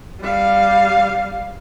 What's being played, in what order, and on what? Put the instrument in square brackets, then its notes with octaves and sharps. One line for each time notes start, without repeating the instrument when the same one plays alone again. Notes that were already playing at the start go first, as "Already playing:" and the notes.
[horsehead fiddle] G3 F5